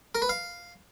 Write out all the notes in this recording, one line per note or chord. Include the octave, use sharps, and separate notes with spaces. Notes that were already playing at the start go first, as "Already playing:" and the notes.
A#4
B4
F5